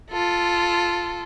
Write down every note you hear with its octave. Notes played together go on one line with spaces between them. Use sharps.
F4 A4